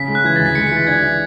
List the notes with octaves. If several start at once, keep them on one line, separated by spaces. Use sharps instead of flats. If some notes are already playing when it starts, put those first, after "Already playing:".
Already playing: C#3 B6
G#3
F#6
E3 G#6
D2 A6
B6
G#3 C#7
B6
E3
A6
D4 G#6
E3